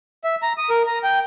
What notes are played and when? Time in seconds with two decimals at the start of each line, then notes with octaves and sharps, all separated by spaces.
0.24 E5
0.42 A#5
0.58 D#6
0.70 A#4
0.86 A#5
1.04 G5